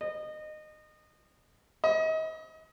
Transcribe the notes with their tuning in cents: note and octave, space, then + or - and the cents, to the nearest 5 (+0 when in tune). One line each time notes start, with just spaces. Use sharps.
D#5 -25
D#5 +35